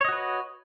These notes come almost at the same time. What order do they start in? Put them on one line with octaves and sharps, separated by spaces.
C#5 D#5 F#4 B4